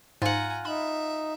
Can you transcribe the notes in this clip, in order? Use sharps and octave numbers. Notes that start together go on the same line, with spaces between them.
G#2 F4 F#5 G#5 A#5
D#4 E5 B5